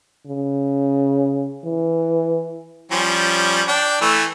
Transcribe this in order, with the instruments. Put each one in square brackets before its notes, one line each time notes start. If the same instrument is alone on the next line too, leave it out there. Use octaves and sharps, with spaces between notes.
[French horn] C#3
E3
[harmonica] F3 G3 C#4
D4 G5
E3 A3